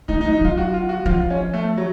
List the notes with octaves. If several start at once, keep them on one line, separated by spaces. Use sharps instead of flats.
A3 D#4
D#4
F#3
D#4
F#3 F4
F#4
F4
F#4
F3 F4
C#4
A3
F#3